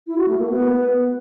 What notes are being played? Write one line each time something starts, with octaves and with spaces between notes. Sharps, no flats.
E4
F#4
A3
A#3
B3